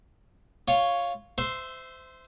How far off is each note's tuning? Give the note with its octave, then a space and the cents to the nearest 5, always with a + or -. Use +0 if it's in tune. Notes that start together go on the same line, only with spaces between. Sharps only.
F4 +0 C#5 +0
C5 -25 E5 +0 C6 +0